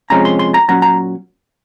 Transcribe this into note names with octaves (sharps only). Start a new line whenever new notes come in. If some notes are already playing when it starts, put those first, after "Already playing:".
C3 F3 G#3 C#4 A#5
C6
C6
A#5
A#2 F#3 C#4 A#5
A#5